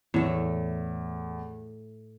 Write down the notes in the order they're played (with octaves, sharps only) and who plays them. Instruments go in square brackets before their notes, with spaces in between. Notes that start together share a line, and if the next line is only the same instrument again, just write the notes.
[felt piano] E2 [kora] A2 A3